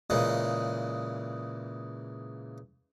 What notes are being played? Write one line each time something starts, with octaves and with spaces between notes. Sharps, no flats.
A#2 C#3 E3 G#3